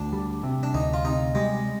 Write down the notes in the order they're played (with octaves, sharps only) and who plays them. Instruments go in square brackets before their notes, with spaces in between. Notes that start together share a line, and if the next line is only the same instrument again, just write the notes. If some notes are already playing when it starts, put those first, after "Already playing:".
Already playing: [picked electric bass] D2 [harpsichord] D4
[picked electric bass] G3
C3
[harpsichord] D4
[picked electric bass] D2 [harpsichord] D#4
[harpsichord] F4
[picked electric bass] C3 [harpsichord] D#4
[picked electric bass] G3 [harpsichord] G#3